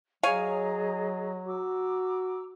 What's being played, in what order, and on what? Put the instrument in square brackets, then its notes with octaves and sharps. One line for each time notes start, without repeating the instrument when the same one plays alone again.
[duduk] F#3 [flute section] G#4 D#5 A#5 [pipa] C#5 F5 G#5
[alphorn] F#4 [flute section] A#5 D6 E6